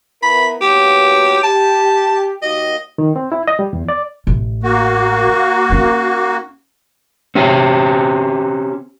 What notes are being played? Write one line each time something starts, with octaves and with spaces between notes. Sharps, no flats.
B3 E4 A#4 B5
F#3 A#3 B3 G4
G4 A5
D#2 F#4 D#5
D#3
C4
E4
D#5
G3
E2
D5
A1
A#3 F#4
C#4 D#4
C4 C#4 G4